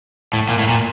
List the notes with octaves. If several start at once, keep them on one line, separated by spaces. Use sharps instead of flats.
A2
A#2
A2
A#2